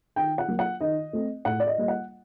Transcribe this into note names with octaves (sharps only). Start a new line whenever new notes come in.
D#3 G5
F#5
F#3 A#3
F#5
D#3 D#5
A3 C4
A2 F#5
D5
D#5
G3 A#3 D#5
F#5